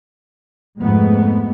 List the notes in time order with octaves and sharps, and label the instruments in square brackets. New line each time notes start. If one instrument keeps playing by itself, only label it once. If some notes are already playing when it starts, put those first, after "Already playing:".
[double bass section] F2 G#2 G#3 A3 B3